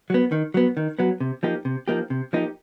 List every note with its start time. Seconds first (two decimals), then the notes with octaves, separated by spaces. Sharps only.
0.10 F#3 B3
0.32 D#3
0.54 F#3 B3
0.77 D#3
0.99 F#3 B3
1.20 C3
1.43 F3 A#3 D#4 G4
1.65 C3
1.88 F3 A#3 D#4 G4
2.10 C3
2.33 F3 A#3 D#4 G4